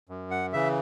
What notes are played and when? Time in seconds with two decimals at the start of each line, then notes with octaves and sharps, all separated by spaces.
0.09 F#2
0.31 F#5
0.53 C#3 E3 E5